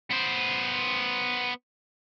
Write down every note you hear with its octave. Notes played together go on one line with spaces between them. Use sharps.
B3 C5